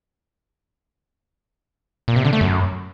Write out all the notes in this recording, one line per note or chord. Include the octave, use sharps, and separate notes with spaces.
A#2
C3
D3
A3
F#2